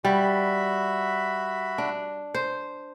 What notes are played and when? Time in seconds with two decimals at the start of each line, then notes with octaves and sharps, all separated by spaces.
0.05 G3 F#4 E5 B5
1.78 D4
2.34 C5